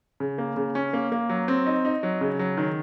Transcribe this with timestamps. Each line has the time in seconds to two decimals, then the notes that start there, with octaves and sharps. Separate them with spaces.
0.20 C#3
0.38 A#3
0.57 C#3
0.75 C#4
0.93 A#3
1.12 A#3
1.29 F#3
1.48 C4
1.66 D#4
1.85 D#4
2.03 F#3
2.21 C#3
2.39 F#3
2.58 D#3